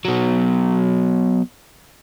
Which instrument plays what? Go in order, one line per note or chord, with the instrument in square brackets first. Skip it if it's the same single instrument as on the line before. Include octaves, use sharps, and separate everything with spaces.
[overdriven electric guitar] B2 F#3